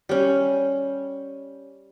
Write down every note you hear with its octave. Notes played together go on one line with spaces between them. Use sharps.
G3 C#4